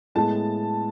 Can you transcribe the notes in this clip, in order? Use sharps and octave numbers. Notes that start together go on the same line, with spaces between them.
A2 G#3 B3 A5